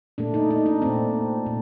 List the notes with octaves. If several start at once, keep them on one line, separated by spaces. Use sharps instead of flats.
A#2 A3 D4
D#4
D#4
D4
A#2 A3 C4
A#2